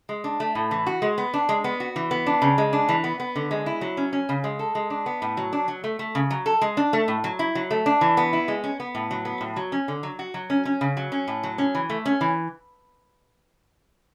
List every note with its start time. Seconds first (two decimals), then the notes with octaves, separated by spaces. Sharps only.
0.09 G#3
0.24 D4
0.40 A3
0.55 A2
0.71 E3
0.87 F#4
1.02 G#3
1.18 B3
1.34 D4
1.49 G#3
1.64 B3
1.80 F#4
1.96 E3
2.11 B3
2.26 D4
2.42 C#3
2.58 G#3
2.73 D4
2.89 E3
3.04 B3
3.20 B3
3.36 D3
3.51 G#3
3.66 E4
3.81 F#3
3.97 C#4
4.13 C#4
4.29 C#3
4.44 G#3
4.59 A4
4.75 G#3
4.90 D4
5.06 B3
5.22 A2
5.37 F#3
5.53 D4
5.68 F#3
5.84 A3
5.99 A3
6.15 C#3
6.31 F#3
6.46 A4
6.61 G#3
6.77 D4
6.93 A3
7.08 A2
7.24 F#3
7.39 E4
7.55 F#3
7.71 A3
7.86 D4
8.01 E3
8.17 B3
8.33 E4
8.48 G#3
8.64 C#4
8.80 B3
8.95 A2
9.11 F#3
9.25 B3
9.41 A2
9.56 F#3
9.72 C#4
9.88 D3
10.03 F#3
10.19 F#4
10.34 F#3
10.50 C#4
10.65 C#4
10.81 C#3
10.97 F#3
11.12 C#4
11.28 A2
11.43 F#3
11.58 C#4
11.75 E3
11.90 A3
12.06 C#4
12.21 E3